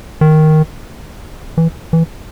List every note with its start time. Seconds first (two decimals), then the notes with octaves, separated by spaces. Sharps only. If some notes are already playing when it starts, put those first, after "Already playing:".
0.21 D#3
1.57 E3
1.93 E3